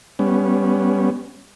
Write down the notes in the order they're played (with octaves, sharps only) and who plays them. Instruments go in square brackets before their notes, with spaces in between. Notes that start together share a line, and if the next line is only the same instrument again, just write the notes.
[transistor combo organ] G3 B3 C#4